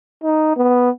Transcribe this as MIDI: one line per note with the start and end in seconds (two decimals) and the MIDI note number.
0.23 0.55 63
0.57 0.90 59